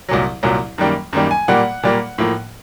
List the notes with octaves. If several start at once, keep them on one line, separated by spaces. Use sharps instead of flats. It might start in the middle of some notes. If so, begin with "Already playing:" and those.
C2 A#2 F#3
C2 A#2 F#3
F#2 D#3 G3 A#3
F#2 D#3 G3 A#3
G#5
A#2 G3 A#3 F#5
A#2 G3 A#3
A2 F3 A#3